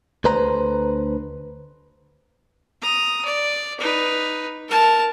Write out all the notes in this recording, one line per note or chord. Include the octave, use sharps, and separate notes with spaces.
D2 D3 B4 C5 A#5
A#5 D#6
D5
D#4 B4
A#4 A5